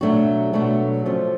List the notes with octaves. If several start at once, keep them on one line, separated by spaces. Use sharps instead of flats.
B2 F#3 A3 D4 F#4
B2 F#3 A3 D4 F#4
D3 F3 A3 C#4